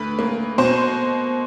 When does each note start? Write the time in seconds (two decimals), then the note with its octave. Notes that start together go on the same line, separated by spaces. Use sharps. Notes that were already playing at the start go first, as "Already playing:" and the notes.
Already playing: D2 B4
0.19 A#3
0.58 B2 C5